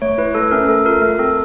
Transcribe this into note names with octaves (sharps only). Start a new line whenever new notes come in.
A3 C#5
E4 B4
A3 A4
C#4 A#4
A3 A4
F4 A#4
A3 A#4
C4 A4